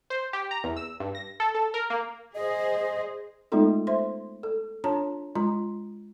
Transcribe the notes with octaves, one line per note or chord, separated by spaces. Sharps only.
C5
G4
A#5
E2
E6
G2
A#6
A4
A4
A#4
A#3
G#4 C5 D#5
G#3 A3 B3 D#4 F4 A4
C5 E5 C6
A4
D4 F4 C#5 A5 A#5
G#3 F4 A#5